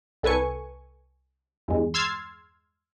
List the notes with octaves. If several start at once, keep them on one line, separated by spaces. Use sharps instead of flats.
C2 A4 B4 G#5 C#6
E2 G2 G#3
C6 E6 F6 G#6 A6 C7